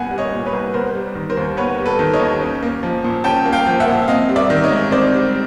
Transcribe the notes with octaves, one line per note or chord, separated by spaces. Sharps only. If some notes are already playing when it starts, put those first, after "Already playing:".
Already playing: C2 A#2 B3 F#5 G#5
G3
C#5 D#5
A#2
B4 C#5
C2
B3 A#4 C5
G3
D#3
A#4 C5
D#2
B3 B4 C#5
G3
A4 B4
D#3
C#5 D#5
D#2
C#4
A#3
F3
A#2
C#4 G5 A5
A#3
F5 G5
F3
E5 F#5
A#2
C4 D#5 F5
G3
D5 E5
D#3
C#5 D#5
G#2
C4 C5 D5
G3